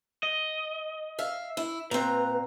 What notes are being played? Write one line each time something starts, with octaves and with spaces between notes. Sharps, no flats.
D#5
E5 F5
E4
A#2 C4 B4 A#5